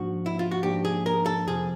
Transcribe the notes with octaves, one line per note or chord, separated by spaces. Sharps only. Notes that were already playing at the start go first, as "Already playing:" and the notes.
Already playing: G#2 F3 A#3 D4 F#4
E4
F4
F#4
G#2 F3 A#3 D4 G4
G#4
A#4
A4
F2 C3 F3 G#4